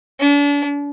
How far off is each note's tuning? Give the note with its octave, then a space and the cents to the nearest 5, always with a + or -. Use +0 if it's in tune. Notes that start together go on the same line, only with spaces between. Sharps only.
D4 -40